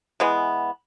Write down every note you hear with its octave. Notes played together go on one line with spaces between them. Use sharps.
E3 G#3 B3